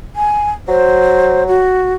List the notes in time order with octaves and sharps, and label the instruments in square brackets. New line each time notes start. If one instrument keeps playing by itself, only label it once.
[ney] G#5
[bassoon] F#3 [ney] C5
[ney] F#4